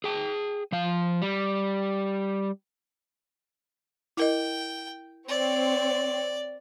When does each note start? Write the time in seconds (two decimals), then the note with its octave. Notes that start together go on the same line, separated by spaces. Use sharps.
0.04 G#4 G5
0.72 F3 F5
1.22 G3
4.17 E4 A#4 D#5 G5
5.28 C4 C#5 D5